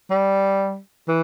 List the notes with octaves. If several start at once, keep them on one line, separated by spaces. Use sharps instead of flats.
G3
E3